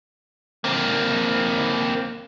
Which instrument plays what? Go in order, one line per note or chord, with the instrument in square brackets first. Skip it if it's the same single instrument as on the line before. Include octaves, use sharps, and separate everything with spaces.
[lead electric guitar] A#3 C4